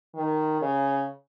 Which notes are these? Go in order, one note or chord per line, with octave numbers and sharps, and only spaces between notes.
D#3
C#3